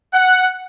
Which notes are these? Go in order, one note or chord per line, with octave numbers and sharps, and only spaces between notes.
F#5